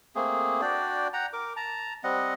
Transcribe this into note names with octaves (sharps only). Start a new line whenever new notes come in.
A3 A#3 C4 G#4
D4 F#4 D5 G5
F#5 G5 A#5
A#4 D6
A5 A#5
G3 C4 D#5 F#5